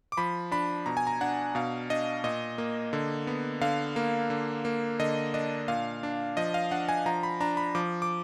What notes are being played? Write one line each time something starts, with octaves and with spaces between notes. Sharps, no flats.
D6
F3 B5
D4 B5
B2 A#5
G#5
A#5
D4 F#5
B2 F5
D4 D#5
A#2 D#5
A#3
D3
B3
D3 F5
A#3
D3
A#3
D3 D#5
D4 D#5
A#2 F5
D4
F3 D#5
F5
D4 F#5
G#5
F3 A#5
B5
D4 A#5
B5
F3 D6
D6